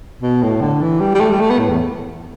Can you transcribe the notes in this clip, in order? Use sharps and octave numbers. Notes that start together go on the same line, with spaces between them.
B2
A2
D3
E3
G3
G3
A3
G3
A3
B3
A2
E2